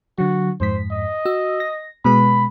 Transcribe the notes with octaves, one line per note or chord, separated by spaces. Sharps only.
D3 F#3 F#4
F2 G#2 C5 B6
D#5
F#4 E6
A#6
B2 G#3 B4 B5